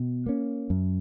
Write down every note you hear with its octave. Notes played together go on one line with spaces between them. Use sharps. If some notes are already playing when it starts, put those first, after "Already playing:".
Already playing: B2
A#3 C#4
F#2